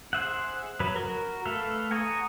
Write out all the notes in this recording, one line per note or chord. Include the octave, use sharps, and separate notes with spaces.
G#4 C5 E5 F#5
F#3 B4
F#4 A#4
A3 A4 B4 E5 F5
F#5 G#5 A#5 C#6 D#6